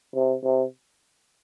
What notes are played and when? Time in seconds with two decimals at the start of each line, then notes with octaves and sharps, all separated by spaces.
0.15 C3
0.44 C3